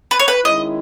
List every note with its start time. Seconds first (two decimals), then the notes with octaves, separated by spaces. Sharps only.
0.11 B4
0.19 C#5
0.28 B4
0.45 D#3 G#3 C#4 E4 D#5